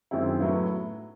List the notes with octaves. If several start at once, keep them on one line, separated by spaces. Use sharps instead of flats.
F#2 D#3 G#3 C4 E4
A2 F#3 B3 E4